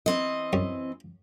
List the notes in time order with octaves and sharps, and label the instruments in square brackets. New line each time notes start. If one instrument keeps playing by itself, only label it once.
[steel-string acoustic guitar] E3 C4 D#5
[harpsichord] F#2